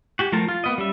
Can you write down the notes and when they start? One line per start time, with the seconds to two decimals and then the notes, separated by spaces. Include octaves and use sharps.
0.19 F#4 G4 G#5
0.32 F3 A3 F4 A#4 A5
0.48 F4
0.64 A#3 B3 D#5
0.78 G3 C#4 E5